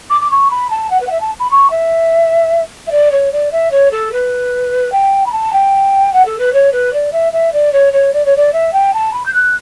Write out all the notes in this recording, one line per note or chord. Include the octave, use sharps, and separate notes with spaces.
D6
D6
C#6
B5
A5
F#5
B4
F#5
E5
A5
B5
C#6
E5
E5
D5
C#5
D5
E5
C#5
A4
B4
G5
B5
A5
G5
F#5
A4
B4
C#5
B4
D5
E5
E5
D5
C#5
C#5
D5
C#5
D5
E5
G5
A5
B5
G6
F#6